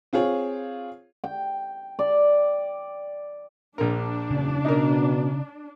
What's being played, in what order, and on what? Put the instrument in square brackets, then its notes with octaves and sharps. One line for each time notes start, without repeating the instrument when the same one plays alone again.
[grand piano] C4 F4 G#4 C#5
[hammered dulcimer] G5
D5
[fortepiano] A#1 A#4 [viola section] D4
[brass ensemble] F#1 E2 [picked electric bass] C#3
[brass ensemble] B2 [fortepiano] D#4 A#4